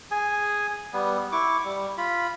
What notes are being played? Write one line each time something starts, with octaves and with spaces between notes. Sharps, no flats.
G#4 G#5
G3 B3
E4 C#6 D6
G3
F4 B5